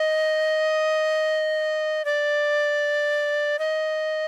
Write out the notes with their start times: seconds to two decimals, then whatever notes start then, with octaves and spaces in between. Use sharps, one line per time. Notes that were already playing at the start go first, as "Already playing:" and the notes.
Already playing: D#5
2.05 D5
3.59 D#5